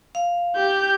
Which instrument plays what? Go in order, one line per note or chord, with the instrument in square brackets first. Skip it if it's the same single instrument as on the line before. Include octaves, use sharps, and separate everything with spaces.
[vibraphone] F5
[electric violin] G4 G6